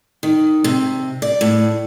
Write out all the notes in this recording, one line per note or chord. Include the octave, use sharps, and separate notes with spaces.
D#3
C3
D5
A2